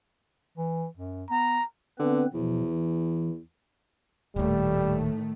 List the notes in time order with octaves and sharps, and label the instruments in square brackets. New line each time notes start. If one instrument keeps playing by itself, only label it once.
[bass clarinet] E3
F#2
[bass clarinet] B3 [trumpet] A#5
[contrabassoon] D3 [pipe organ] B3 C4 B4
[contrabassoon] E2 [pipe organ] B2 F3
[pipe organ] E3
[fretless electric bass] D#1 D#2 [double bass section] A2 D#3 A3 [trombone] G3